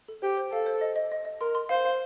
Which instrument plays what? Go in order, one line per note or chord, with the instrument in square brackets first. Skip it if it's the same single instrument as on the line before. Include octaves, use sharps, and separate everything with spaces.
[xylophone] A4
[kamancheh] G4 [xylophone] C5
[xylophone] C5
[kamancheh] A4 [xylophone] F5
[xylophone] C5
D#5
D#5
D#5
D#5
[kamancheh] A#4 [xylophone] C6
[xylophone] C6
[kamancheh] C5 [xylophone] F5
[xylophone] F5